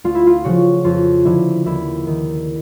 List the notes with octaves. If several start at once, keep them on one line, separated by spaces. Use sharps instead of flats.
D2 F4
E4
F4
C#3 F3 F#4
F2 F4
D3 F3 E4
D#2 E4
D#3